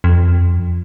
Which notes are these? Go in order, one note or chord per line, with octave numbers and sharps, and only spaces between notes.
F2